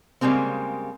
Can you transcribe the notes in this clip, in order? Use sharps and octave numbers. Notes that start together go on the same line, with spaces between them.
C#3 G3 G#3 A#3 C4